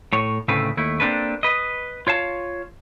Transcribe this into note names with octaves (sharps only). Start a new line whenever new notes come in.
A2 C#5
D2 A2 C#3 A3 C4 B4
D#2 A3 E4
A#3 C4 D4 A4 B4
B4 D#5
F4 C#5 F5 A5